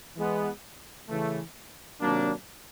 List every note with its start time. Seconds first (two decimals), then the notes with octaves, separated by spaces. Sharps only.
0.16 E3 G#3 B3
1.08 C#3 E3 A3
2.00 C3 D#3 F#3 A#3 D4